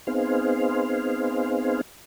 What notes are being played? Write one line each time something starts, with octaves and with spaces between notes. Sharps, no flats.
B3 C4 D#4 G#4 C5 F5